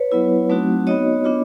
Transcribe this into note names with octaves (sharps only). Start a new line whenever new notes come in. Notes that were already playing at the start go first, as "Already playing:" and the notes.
Already playing: B4 C#5
F#3 B3 E4
F#3 A3 C4 D#4 F#4
B3 D#4 F#4 C#5 D#5
B3 D4 F4